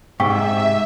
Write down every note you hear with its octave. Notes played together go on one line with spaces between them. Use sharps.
G#2 C3 E5 F5 G5 C#6